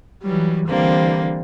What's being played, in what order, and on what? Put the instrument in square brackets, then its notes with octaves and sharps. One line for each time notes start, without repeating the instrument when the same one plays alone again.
[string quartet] E3 F#3 G3
D3 E3 G3 A#3 C4